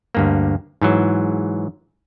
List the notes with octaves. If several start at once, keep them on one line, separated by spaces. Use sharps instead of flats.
D2 G2 A#3
G#2 E3 F#3